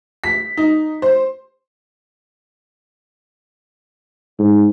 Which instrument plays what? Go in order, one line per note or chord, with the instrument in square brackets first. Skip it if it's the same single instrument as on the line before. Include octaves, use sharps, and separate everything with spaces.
[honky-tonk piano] B6
D#4
C5
[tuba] G#2